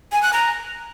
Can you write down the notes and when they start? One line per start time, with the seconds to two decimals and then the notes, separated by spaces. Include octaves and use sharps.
0.12 G#5
0.23 F#6
0.33 A#5